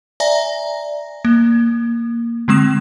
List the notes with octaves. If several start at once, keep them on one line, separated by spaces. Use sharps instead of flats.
D5 E5 G#5 A#5 A#6
A#3
D3 G#3 C4 D#6 E7